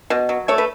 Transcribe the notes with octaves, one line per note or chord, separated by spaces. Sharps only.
B2
F#3
A3 C#5
B4